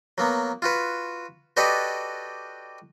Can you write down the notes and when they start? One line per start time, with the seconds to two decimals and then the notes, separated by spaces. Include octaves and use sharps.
0.18 F#3 A#3 B3
0.62 F4 F#4 B4
1.57 F#4 G4 A4 B4 D5 D#5